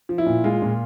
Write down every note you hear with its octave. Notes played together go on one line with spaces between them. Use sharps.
F3
E4
A#2
G#3 F4
A#2